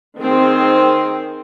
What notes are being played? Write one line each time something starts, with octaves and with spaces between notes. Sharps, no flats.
D#3 C4 G#4